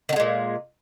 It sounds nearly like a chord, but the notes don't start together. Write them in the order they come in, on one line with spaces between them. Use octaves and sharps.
D#3 D3 G#3 A#2